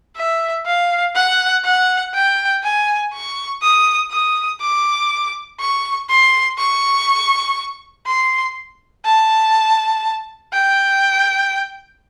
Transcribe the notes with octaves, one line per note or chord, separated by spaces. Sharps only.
E5
F5
F#5
F#5
G5
G#5
C#6
D#6
D#6
D6
C#6
C6
C#6
C6
A5
G5